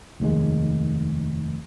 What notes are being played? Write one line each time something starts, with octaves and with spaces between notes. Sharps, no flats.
F1 D#2 C3 G#3